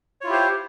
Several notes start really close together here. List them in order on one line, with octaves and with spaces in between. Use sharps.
C#5 F4 E4 G4 C5